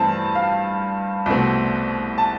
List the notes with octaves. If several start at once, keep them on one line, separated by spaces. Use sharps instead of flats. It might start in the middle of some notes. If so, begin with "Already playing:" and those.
Already playing: G2 E3 A3 C4 A5
F5
C2 B2 A3 C4
A5